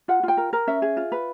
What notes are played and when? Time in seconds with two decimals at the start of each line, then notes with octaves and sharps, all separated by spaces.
0.08 F4 F#5
0.23 F4 G5
0.37 A#4
0.53 A#4
0.67 C#4 E5
0.82 G#4
0.97 F4
1.12 B4